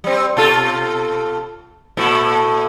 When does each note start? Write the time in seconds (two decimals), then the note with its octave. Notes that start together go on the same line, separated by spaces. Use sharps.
0.04 G3 C4
0.37 B2 F4 A4
1.97 A#2 A3 E4